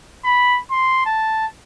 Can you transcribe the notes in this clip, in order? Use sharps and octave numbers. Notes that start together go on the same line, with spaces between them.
B5
C6
A5